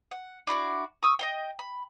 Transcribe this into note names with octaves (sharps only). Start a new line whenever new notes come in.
F#5
D4 E4 F#4 D5
C#6 D#6 E6
D#5 F5 G5
B5